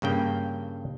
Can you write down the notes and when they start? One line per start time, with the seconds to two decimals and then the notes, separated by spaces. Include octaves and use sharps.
0.02 G2 C#3 A#3 G5